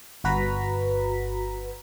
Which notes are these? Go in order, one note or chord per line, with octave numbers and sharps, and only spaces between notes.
G1 F#4 B4 A#5 B6